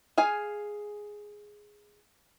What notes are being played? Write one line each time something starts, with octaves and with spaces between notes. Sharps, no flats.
G#4 F5 G#5